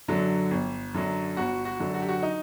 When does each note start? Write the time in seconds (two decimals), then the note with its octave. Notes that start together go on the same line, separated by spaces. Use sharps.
0.08 F#2 D3 F#3
0.51 G1
0.94 F#2 D3 F#3
1.37 G1 F#4
1.65 F#4
1.80 F#2 D3 F#3
1.94 F#4
2.02 G4
2.09 F#4
2.23 D#4